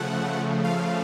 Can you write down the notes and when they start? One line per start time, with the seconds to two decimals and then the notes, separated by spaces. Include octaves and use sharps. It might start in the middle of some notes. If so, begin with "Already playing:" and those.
Already playing: C#3 F3 A3 F#5
0.64 F5